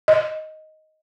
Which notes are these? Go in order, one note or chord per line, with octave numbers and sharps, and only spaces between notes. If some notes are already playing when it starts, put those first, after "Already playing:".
D#5